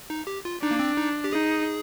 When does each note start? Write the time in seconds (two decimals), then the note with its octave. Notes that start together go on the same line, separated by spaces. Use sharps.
0.10 D#4
0.27 G4
0.45 F4
0.62 D4 D#4
0.71 A#3
0.79 C4
0.97 D#4
1.24 G4
1.32 D#4 G#4